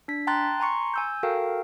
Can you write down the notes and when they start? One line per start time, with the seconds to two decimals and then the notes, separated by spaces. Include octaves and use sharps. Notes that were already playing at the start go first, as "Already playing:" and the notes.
0.08 D4 B6
0.27 G5 A5 A#5 C6 F#6 A6
0.60 G#5 A#5 C6 C#6 C#7
0.94 G#5 E6 G6
1.23 F#4 A4 A#4 F5 G5